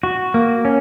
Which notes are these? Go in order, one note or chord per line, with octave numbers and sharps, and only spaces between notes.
F#4
A#3
C#4